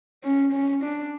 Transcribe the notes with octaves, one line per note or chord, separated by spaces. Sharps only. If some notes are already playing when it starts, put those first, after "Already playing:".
C#4
C#4
D4